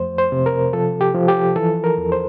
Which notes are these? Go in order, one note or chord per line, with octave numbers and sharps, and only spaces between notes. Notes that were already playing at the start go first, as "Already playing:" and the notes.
Already playing: F2 F3 A3 C5
C5
C3
A#4
F3 A4
G4
F3
G4
E3 A4
A#4
E2
C5